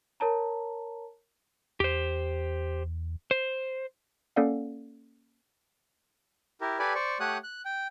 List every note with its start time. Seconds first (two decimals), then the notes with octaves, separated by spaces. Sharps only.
0.20 A#4 C#5 A5 A#5
1.80 E2 G4 C5
3.31 C5
4.36 A#3 C#4 A4 D5 F5 F#5
6.61 E4 G4 A#4
6.79 G4 A4 B4 D5 G#5 B5
6.95 C5 D5 C#6
7.20 A3 G4 C#5 F#5 D#6 F#6
7.44 F#6
7.65 G5